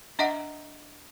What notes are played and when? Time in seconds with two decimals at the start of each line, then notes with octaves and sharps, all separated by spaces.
0.19 D4 D#5 E5 F#5